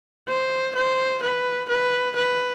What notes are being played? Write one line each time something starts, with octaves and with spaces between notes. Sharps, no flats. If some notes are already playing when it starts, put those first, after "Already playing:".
C5
C5
B4
B4
B4